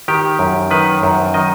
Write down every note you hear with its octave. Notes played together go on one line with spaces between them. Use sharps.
D#3 G4
F#2
D#3 B4
F#2
D#3 D#5